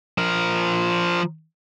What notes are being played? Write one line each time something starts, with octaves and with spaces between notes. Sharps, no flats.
F3 A#4